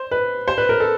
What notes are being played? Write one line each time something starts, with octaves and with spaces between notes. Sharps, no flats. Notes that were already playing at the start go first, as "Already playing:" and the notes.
Already playing: C5
B4
C5
B4
A#4
A4